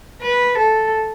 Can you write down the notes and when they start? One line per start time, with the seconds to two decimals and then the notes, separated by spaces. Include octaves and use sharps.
0.22 B4
0.59 A4